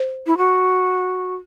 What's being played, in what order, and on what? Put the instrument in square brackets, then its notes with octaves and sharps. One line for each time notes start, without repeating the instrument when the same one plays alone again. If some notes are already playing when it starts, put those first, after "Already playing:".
Already playing: [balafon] C5
[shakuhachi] E4
F#4